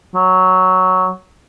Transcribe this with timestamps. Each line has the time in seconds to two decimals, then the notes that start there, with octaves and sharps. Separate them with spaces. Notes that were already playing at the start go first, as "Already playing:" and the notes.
0.15 F#3